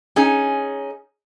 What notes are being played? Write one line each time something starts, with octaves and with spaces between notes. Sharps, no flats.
C#4 D#4 G#4